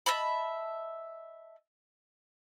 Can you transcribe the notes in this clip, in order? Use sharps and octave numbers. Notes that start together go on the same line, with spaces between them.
D#5 E5 A5 B5